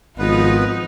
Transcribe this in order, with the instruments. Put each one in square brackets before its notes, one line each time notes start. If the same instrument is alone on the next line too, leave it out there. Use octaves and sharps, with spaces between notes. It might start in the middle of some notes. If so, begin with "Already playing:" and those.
[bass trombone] G#1 [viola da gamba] F3 D#4 F4 [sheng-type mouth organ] B3 B4